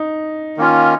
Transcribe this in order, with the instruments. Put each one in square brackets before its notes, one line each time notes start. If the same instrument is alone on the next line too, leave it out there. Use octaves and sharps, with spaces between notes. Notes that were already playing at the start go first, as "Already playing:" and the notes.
Already playing: [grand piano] D#4
[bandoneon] D#3 A#3 C#4 F4